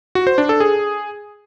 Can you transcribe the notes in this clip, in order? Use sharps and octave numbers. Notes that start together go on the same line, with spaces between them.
F#4
C5
D4
A4
G#4